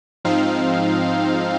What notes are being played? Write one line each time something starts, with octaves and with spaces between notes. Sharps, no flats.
G#2 F3 C4 D#4 F5